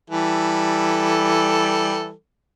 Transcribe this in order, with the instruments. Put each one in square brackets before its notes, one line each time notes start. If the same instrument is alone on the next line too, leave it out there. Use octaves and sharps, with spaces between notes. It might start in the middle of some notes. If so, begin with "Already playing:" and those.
[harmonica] E3 G3 A4